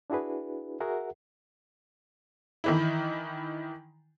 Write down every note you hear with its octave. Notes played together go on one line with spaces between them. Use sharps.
D4 E4 F#4 G#4 B4
F#4 G#4 A#4 E5 F#5
D#3 E3 E4